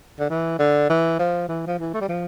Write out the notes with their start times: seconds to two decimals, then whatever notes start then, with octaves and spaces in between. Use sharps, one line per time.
0.19 D3
0.30 E3
0.59 D3
0.90 E3
1.19 F3
1.49 E3
1.67 F3
1.79 E3
1.94 A3
2.01 G3
2.08 F3